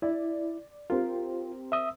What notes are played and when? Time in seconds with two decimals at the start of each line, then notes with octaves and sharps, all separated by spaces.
0.02 E4 D5
0.90 C4 F4 G4 A#4
1.72 E5 D#6 E6